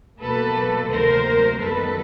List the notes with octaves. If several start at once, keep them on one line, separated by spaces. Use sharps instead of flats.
B2 F#3 A#3 A4 B4
D2 C3 D#3 F#3 A#3 A#4 C5
F#2 D#3 G3 B3 A4 B4